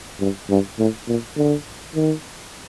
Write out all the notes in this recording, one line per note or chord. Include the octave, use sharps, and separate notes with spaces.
G2
G2
A2
A#2
D3
D#3